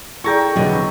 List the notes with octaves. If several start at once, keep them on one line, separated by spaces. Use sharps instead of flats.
E4 G#4 A4 D5 G5 A#5 C#6
E2 B2 D3 F#3